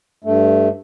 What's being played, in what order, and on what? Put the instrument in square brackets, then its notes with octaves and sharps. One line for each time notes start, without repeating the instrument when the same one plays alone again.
[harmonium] G2 A3